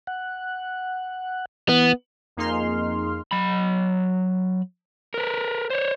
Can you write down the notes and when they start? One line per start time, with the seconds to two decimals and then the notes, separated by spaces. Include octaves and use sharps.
0.07 F#5
1.69 E3 B3
2.37 F2 A#3 D#4 G#4 C6 F6
3.31 F#3 B5
5.14 A#4 B4
5.70 C5 C#5